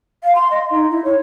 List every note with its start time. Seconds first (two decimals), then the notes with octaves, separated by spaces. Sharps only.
0.23 F5
0.35 C6
0.51 D#5
0.71 D#4
0.90 E4
1.04 C#5